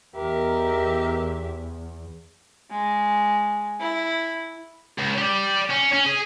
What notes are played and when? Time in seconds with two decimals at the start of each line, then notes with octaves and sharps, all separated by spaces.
0.16 E2 D#4 G4 A#4 E5
2.71 G#3
3.80 E4
4.98 C#2
5.18 G4 D5
5.70 C#4
5.93 C#4
6.06 G#4